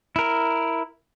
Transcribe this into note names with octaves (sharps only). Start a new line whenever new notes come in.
E4 A#4